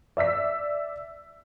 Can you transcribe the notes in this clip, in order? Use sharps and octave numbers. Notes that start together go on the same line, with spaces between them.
D5 E5 E6 B6